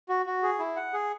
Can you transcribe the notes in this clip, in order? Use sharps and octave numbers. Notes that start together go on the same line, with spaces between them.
F#4
F#4
G#4
E4
F#5
G#4